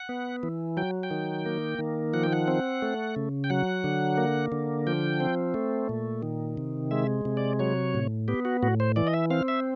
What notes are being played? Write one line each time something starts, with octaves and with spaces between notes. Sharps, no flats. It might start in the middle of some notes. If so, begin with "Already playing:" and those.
Already playing: F#5
B3
E3
F#3 G5
G5
D#3
A#3
D#3
F3 F#5
G5
F#5
C4
A3
C#3
G5
F#3 F#5
D3
A#3
D3
F3 G5
C4
A3
A#2
D#3
C3
G#3 E5
C3
D5
F#3 C#5
A2
B3 G4
F#4
A2 F#4
C5
E3 D5
D#5
E5
C4 F5
E5